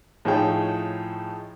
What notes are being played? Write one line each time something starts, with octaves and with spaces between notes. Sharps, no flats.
A2 F3 D#4 G#4 C#5 G5